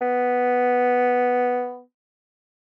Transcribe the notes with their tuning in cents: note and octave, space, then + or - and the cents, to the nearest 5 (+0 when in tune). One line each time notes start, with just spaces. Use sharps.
B3 +0